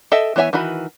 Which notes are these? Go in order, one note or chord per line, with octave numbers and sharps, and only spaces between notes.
A4 D#5 E5 G5
E3 B3 C#5 E5 G#5
D#3 E3 F#4 B5